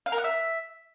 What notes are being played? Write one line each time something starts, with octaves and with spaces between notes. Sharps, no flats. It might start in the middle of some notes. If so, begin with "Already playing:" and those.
F5
A#4
F#5
E5